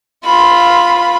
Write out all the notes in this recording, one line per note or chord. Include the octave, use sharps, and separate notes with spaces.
F4 B5